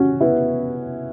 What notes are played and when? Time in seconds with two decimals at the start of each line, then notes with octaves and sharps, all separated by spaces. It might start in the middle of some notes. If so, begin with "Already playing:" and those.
Already playing: C#4 F#4
0.21 B3 E4